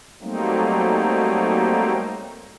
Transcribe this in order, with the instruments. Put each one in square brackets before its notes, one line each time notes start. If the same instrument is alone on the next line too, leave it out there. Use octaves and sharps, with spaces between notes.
[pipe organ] F#3 G3 A3 A#3 C4 D#4